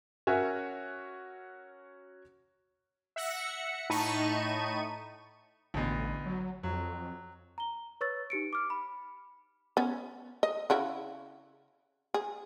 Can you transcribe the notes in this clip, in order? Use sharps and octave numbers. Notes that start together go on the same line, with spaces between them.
C#4 F#4 A#4 C#5 E5 G#5
E5 F#5 A#6 C#7
A2 D#4 A5 B5 C#6 D#7
A1 D2 B2
F#3
F2 F#3
A#5 G7
B4 C#5 C#6 E6 A6
D#4 G4 C#7 D7
D6 F6
B5
B3 C#4
D#5
C#3 E4 F#4
G#4